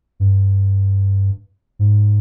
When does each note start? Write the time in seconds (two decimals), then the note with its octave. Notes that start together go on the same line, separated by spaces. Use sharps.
0.20 G2
1.79 G#2